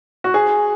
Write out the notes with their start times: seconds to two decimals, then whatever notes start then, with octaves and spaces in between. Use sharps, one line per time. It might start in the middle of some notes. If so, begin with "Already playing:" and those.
0.24 F#4
0.34 G#4